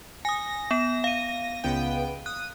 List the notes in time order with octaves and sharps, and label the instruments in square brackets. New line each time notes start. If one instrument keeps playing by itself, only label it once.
[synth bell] G#5 D#6 [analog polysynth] A#6
[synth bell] B3 E7
F5 D#7
[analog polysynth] C#2 B3 G5
[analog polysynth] D#6 [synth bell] F#6